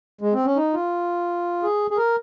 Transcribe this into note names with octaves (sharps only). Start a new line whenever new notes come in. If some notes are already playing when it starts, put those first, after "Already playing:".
G#3
C4
C#4
D#4
F4
G#4
G#4
A#4